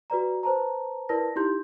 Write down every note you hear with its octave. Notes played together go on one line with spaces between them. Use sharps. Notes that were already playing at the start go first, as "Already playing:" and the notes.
F#4 B4 D5 A#5
B4 C5 A5 A#5
E4 A#4 B4 D5 A5 A#6
D#4 E4 G4 C6 G6